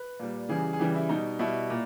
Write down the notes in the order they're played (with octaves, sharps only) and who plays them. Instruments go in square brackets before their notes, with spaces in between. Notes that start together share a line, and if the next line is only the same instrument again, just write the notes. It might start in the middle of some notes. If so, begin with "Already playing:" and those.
Already playing: [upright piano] B4
A#2 G3
C#3 E3 G3 G#4
G#4
C#3 E3 G3 G4
E4
B2 G3 D#4
B2 G3 E4
A#2